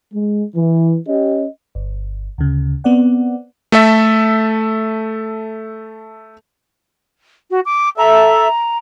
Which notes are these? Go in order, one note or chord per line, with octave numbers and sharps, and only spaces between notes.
G#3
E3
C#4 G4 D#5
G1
D2 C#3
B3 C4 D5 F#5
A3 A4 E5
F#4
D6
A4 E5 A#5